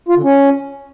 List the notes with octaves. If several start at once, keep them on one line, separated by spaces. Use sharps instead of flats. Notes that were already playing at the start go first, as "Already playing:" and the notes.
F4
D3
C#4